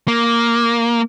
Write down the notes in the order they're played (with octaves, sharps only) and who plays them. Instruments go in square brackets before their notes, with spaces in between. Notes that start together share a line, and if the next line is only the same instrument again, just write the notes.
[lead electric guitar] A#3